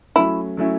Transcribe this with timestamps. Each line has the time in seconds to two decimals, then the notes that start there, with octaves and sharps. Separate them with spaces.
0.16 F#3 A3 C#4 E4
0.57 F#3 A3 C#4 E4